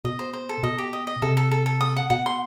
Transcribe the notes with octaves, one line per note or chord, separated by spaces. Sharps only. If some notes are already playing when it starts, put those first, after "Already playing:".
B2 D#5
C5
C5
A4
B2 D#5
G4
D#5
D#5
C3 A4
A4
A4
A4
D#6
F#5
B2 F#5
C6